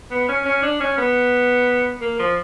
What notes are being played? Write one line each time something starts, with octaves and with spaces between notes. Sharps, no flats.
B3
C#4
C#4
D4
C#4
B3
A#3
F3